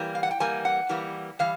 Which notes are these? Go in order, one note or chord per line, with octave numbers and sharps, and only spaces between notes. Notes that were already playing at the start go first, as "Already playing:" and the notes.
Already playing: E3 G3 A#3
F5
F#5
G5
E3 G3 A#3 G#5
F#5
E3 G3 A#3
E3 G3 F5